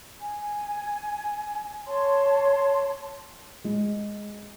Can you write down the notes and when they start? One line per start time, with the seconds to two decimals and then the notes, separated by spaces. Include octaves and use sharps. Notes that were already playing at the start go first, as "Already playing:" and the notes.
0.21 G#5
1.86 C#5 A5 C6
3.64 G#3